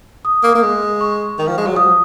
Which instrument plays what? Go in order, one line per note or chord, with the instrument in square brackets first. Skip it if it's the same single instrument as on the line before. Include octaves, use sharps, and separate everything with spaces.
[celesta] D#6
[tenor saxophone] A#3
A#3
G#3
[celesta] C#6
[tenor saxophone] D#3
F3
G#3
F#3
[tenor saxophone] F3 [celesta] D#6